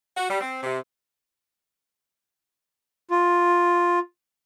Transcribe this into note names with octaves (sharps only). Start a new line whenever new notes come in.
F#4
G3
C4
C3
F4